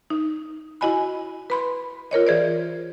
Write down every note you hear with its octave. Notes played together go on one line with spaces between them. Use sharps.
D#4
E4 F#4 D#5 G#5 B5
B4 B5 C6
F4 A#4 C#5 D#5
E3 G#4 C5 D5